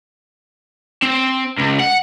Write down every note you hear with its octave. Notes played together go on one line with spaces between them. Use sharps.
C4
C#2
F#5